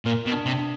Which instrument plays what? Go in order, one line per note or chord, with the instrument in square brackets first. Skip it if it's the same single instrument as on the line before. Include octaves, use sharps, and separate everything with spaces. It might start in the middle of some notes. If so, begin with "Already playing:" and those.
[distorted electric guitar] A#2 [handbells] A#4
[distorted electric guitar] B2
[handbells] D4
[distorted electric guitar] C3
[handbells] D4